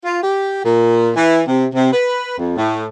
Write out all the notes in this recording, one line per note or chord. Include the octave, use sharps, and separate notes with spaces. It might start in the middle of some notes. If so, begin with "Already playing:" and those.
F4
G4
A#2
E3
C3
C3
B4
F2
A2